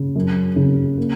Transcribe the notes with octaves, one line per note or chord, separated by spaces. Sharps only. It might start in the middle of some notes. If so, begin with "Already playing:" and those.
Already playing: C#3
F#2
C#3
A#3